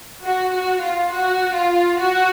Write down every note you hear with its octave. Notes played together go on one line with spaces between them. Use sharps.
F#4
F#4
F4
F#4
F4
F#4